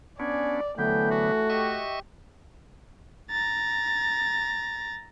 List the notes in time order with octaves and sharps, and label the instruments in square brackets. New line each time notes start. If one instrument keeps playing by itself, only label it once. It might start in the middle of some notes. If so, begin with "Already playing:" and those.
[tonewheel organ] B3 C#4 D4 [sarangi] D5 [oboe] G#5
[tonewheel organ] D3 F#3 B3 [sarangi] E3 [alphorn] A3 [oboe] G5
[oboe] F#4
[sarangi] G4 [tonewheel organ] D#5 E5 C#6
[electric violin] A#5 A6